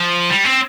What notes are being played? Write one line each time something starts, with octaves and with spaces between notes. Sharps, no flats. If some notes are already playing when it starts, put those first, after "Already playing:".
Already playing: F3
G3
C4